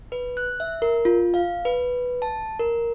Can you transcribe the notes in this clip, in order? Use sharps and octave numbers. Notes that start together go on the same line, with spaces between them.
B4
F#6
E5
A#4
F4
F5
B4
A5
A#4